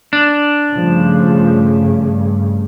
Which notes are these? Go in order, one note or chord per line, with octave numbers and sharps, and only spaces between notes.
D4
G2 C#3 F3 A3
G2